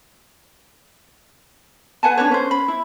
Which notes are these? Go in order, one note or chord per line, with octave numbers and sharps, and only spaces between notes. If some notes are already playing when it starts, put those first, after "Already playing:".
B4 F#5 G#5 A5
D4 F4 B4 C#5
C#4 C5
B5
E4